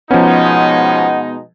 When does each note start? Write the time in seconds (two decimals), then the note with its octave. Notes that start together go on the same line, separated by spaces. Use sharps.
0.11 B2 F3 G#3 B3 C#4 D#4 F#5